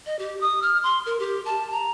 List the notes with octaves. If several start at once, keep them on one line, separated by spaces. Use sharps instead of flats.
D#5
G4
D#6
F6
C6
A#4
G4
A5
A#5